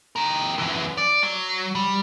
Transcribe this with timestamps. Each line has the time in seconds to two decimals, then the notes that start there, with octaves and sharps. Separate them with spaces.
0.16 G4 A#4
0.59 F#2 E3
0.97 D5
1.23 F#3
1.75 G3